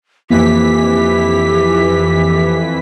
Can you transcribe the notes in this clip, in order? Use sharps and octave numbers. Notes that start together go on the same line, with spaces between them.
F2 E3 A#3 G4 B6